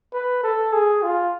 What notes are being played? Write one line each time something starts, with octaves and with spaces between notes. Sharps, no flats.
B4
A4
G#4
F4